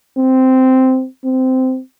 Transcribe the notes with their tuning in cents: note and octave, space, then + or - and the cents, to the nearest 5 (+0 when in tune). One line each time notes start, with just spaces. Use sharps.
C4 -10
C4 -15